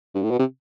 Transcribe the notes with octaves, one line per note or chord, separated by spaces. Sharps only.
G2
A2
B2
C3